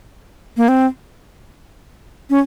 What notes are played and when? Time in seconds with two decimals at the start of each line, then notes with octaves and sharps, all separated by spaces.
0.57 A#3
0.68 C4
2.30 C#4